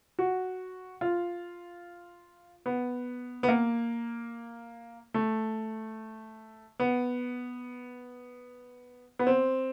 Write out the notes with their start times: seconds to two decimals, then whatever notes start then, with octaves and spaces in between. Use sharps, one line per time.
0.19 F#4
1.01 F4
2.66 B3
3.43 B3
3.49 A#3
5.14 A3
6.80 B3
9.19 B3
9.27 C4